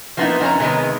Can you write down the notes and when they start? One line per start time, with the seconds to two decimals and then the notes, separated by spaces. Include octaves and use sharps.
0.17 F3 A#3 B3 C#4 D#4 E4
0.41 F2 C#4 A#5
0.60 C3 D#3 G#3 B3